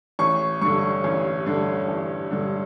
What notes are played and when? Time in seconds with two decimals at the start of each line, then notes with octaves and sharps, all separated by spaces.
0.19 A1 C#6
0.61 G2 D3 C#6
1.04 A1
1.46 G2 D3
1.89 A1
2.31 G2 D3